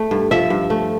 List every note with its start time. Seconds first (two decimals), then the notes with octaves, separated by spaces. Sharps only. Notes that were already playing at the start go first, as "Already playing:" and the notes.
Already playing: A3
0.11 G2
0.31 F3 E5
0.50 G2
0.70 A3